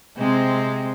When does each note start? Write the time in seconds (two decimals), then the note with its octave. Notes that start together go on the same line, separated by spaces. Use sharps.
0.17 C3 G#3 C4